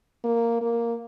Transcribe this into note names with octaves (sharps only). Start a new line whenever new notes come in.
A#3
A#3